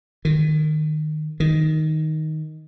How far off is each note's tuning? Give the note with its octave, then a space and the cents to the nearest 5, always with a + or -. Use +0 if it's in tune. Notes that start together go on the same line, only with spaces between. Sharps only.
D#3 -20
D#3 +5